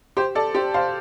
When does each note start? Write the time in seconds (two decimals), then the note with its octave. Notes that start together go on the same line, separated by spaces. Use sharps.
0.17 G4 C5
0.35 A4 D5
0.55 G4 C5
0.74 C5 F5